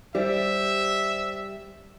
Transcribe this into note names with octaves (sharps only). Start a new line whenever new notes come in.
G3 G4 C5 D5 E5